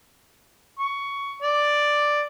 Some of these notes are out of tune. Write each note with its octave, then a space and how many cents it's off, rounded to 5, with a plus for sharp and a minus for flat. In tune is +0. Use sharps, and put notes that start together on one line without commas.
C#6 +15
D5 +5